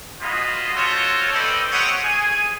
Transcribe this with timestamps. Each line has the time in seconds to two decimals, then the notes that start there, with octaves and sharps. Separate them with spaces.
0.21 F4 F#4 G#4 C5 D#5 B5
0.75 F4 F#4 A4 C5 C#5
1.32 C4 A4 B4 D5 D#5 G5
1.72 C4 G4 C#5 D#5 F#5
2.03 G#4 G#5